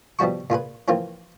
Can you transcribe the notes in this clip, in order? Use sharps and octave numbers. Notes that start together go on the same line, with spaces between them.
B2 F3 G3 F#4 C#6
A#2 F4 G#4 B4
E3 F3 A#3 C4 F4